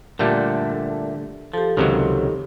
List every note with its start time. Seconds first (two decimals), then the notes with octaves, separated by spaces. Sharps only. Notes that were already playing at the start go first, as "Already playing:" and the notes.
0.19 A#2 D3 G3 A3 E5
1.54 F3 G4 A4
1.77 C#2 C3 D#3 F#3